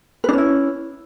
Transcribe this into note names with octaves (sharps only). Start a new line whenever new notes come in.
C#4 D4 E4 B4